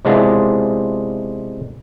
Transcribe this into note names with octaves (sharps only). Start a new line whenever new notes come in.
C3 G#3 B3 D4 E4 F4